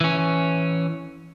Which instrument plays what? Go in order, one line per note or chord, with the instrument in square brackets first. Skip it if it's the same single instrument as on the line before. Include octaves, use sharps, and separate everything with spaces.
[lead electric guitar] E3 C#4